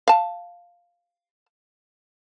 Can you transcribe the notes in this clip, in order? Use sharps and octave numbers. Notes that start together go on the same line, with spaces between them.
F5 A5